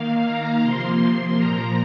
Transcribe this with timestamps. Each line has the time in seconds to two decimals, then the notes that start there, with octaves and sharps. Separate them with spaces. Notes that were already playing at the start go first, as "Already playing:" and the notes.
Already playing: D#3 A#3 F5
0.25 A#5
0.63 C3 F3 A#3 C6
1.37 A#2 F3 A#3 A#5